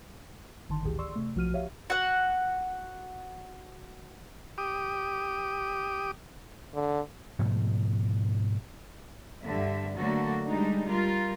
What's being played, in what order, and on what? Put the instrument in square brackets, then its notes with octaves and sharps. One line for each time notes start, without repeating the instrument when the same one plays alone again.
[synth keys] G1 D3 D#3 A5 C6
G#1 D2 A2 E3 G4 G#4
D5 C6 C#6 E6
C3 A3
B1 F3 F#4 F6 D#7
G4 C#5 E5 F5
[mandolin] F#4 F#5
[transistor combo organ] G4 D6 D#6
[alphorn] D3
[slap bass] G#2 B2 F3 A3
[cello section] G2 D3 E5
D3 F#3 A3 A#3 F#4 A4
G3 G#3 D4 D#4
G3 F4 A#4